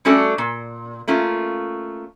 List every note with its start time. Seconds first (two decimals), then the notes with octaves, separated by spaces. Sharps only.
0.05 G3 A3 C#4 D4 F#4 A4
0.38 A#2
1.08 A3 A#3 C#4 F4